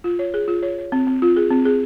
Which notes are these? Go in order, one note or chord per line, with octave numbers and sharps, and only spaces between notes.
F4
C#5
G#4
F4
C#5
C#5
C4
C4
F4
G#4
C4
G#4